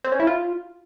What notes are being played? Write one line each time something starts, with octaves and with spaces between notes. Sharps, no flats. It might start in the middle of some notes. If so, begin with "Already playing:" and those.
C4
C#4
E4
F4